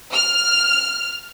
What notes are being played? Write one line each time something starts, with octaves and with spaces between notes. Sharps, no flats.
F6